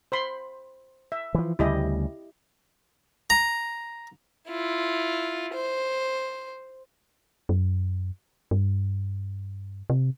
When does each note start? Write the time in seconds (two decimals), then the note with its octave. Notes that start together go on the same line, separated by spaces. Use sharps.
0.12 C5 B5 C6
1.12 E5
1.35 E3 F3
1.59 D2 C#3 G3 E4 G4 D#5
3.30 A#5
4.48 E4 F4
5.54 C5
7.49 F#2
8.51 G2
9.90 C3